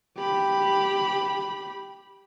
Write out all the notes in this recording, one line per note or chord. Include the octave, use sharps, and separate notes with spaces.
G4 B5